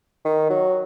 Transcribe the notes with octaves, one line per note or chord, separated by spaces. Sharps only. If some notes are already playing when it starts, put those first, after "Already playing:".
D#3
F#3